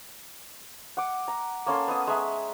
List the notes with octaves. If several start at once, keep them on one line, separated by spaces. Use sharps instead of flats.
F#5 D6
A#5
A#3 C#4 A4 C6
B3 D#5
G#3 E5 A#5